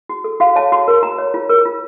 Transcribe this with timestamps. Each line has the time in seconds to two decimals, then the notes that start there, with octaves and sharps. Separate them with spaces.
0.09 F#4
0.24 A4
0.40 F#4 F5
0.56 C#5 A5
0.72 F#4 C6
0.88 A#4
1.03 F#4 A#5
1.18 C#5
1.34 F4
1.49 A#4
1.65 F4